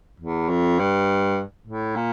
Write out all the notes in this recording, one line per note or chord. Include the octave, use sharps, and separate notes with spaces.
E2
F2
G2
A2
A#2